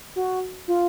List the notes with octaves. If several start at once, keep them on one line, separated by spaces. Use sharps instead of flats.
F#4
F4